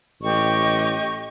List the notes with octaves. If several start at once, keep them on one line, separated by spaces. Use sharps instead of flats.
A1 G4 D#5 C#6